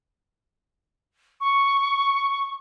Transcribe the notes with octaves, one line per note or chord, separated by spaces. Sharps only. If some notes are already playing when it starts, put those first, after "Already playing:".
C#6